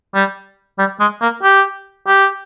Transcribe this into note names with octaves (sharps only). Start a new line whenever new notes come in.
G3
G3
G#3
A#3
G4
G4